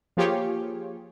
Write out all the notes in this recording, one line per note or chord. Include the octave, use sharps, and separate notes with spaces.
F3 A#3 F4 G4 G#4 C#5